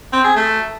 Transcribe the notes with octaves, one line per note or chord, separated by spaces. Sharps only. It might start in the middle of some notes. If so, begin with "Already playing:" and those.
C4
G#4
A3